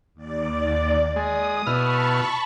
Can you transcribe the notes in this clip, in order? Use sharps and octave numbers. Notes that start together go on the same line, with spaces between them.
D#2 D5
G#3 D#6
B2 E4 A5 B5 C#6 F6